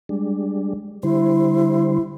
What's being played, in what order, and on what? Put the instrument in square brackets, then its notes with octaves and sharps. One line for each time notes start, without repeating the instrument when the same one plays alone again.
[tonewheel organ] G3 G#3 D4
[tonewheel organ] D3 G3 C5 [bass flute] E4